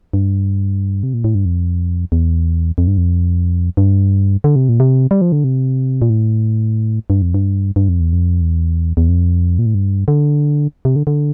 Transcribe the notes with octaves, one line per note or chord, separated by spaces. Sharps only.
G2
C3
A#2
A2
G2
F2
E2
F2
G2
F2
G2
D3
C3
A#2
C3
G3
F3
D3
C3
A#2
A2
G2
F2
G2
G2
F2
E2
F2
E2
E2
F2
A#2
A2
G2
D3
C3
D3
D3